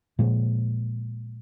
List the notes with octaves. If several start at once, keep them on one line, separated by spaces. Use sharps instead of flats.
A#2 F3 G#3